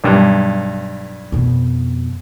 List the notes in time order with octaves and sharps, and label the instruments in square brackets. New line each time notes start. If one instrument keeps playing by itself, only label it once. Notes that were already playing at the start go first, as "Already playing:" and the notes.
[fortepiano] B1 G2
[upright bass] F2 B2